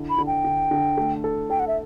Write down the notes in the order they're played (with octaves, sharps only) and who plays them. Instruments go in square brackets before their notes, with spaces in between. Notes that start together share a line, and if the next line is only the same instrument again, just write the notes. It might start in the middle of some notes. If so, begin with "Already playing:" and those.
Already playing: [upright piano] D3 E4
[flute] B5
[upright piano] D3
[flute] G5
[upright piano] D3
D3
A3
A4
[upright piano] A4 [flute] G5
[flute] F#5
E5